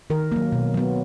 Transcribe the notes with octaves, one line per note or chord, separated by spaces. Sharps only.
D#3 A#4
F#3 A#3
B2
F#3 B3